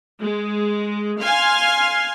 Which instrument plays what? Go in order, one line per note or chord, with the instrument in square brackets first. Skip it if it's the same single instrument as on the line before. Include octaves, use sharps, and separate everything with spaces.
[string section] G#3
F5 G#5 C6 F6